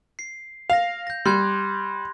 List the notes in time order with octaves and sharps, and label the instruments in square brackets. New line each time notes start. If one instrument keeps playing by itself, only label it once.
[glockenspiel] C7
[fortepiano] F5 [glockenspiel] A#6 F7
[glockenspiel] G6 A#6
[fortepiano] G3 [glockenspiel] C6 F#6 G#6